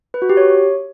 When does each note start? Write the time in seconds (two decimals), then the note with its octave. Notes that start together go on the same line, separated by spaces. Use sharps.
0.14 B4
0.22 F#4
0.29 G4
0.37 C#5